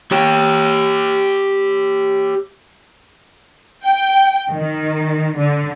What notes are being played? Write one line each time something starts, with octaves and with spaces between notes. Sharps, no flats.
G4 C#5
G5
D#3
D3